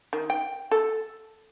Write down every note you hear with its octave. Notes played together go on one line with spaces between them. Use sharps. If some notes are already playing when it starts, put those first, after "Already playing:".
D#3
G5
A4